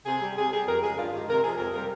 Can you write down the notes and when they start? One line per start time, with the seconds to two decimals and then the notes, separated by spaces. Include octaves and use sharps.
0.06 C3 G#4
0.22 G3
0.37 C3 G#4
0.52 G3 G#4
0.67 F2 A#4
0.82 C#3 G#3 G#4
0.98 G2 F4
1.13 D#3 G#3 G4
1.28 C3 A#4
1.43 F3 G#3 G#4
1.58 F2 A#4
1.73 C3 G3 A#4